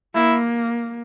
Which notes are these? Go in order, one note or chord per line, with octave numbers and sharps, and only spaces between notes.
A#3 E4